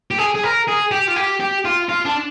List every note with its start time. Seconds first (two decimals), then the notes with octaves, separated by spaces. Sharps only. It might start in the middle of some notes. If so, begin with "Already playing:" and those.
0.11 G4
0.18 G#4
0.35 G#4
0.43 A#4
0.68 G#4
0.91 G4
1.08 F4
1.16 G4
1.40 G4
1.65 F4
1.89 F4
2.06 D4